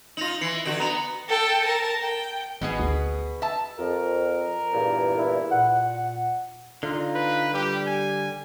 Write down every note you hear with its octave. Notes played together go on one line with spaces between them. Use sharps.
D#4 F4 A#6 F7 F#7
E3 C7 C#7 F#7
D3 F#4 F#7
B3 A#5 F7
A4 G5
A#4 A5
G5
G#1 B2 B3 G#4
D2
E5 A5
F2 A#4
E2 G2 A#2
E4
A#2 F#5
D3 D#4 F4
B4
G3 G4
G#5